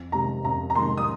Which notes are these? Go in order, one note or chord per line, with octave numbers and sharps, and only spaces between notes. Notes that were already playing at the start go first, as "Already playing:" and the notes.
Already playing: F2
C3 D#3 G#3 A#5
F2 A#5
A#5
C3 D#3 G#3 C6
D#6